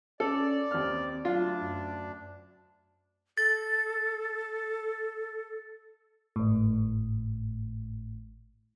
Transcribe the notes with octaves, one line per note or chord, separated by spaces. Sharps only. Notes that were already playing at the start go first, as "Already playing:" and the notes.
C#4 A4 D5
D#2 C4 F6
D2 F#3 D4 F4
F#2
A4 A6
G#1 A2